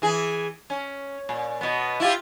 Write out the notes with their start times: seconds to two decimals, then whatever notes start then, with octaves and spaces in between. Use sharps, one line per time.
0.02 E3 G#4
0.70 C#4
1.29 A#2
1.61 B2 B3
2.00 E4 F4 G4